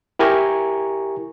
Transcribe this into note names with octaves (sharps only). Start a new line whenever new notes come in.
E4 G4 A#4 G#5 A#5 C#6